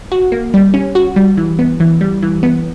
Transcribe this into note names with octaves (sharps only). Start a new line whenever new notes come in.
F#4
A#3
G3
C#4
F#4
G3
E3
B3
E3
G3
E3
B3